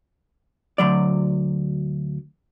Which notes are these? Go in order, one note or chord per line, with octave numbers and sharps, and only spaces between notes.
D2 G#2 F#3 D5